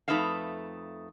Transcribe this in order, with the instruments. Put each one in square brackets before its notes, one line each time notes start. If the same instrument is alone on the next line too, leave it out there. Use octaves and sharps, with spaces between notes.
[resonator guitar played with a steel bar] F2 A3 D#4 B4 E5 F5